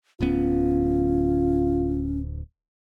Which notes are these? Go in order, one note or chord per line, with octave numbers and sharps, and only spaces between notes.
D1 D2 B3 C#4 F4